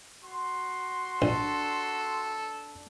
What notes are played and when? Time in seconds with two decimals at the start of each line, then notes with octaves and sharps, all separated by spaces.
0.23 F#4 C6
1.22 A#1 D4 A4